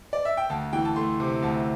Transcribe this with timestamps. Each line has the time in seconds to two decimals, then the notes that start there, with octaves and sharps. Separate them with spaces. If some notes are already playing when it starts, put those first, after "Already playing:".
0.13 D5
0.25 E5
0.37 G5
0.50 D2 A5
0.73 E3 G5
0.85 A5
0.96 A3 C6
1.20 C3
1.42 D2 A5